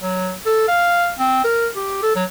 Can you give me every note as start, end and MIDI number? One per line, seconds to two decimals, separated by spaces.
0.02 0.34 54
0.46 0.64 69
0.68 1.12 77
1.19 1.44 60
1.44 1.68 70
1.76 2.01 67
2.03 2.13 69
2.16 2.24 54